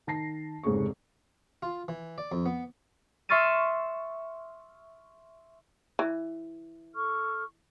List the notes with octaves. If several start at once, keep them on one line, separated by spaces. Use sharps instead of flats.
D#3 A5 A#6 C7
F1 G#2 C#3 G#4 C#6
F4
E3
D5
F2
B3
E5 C6 C#6 F6 A6 D#7
E3
A4 C#6 F6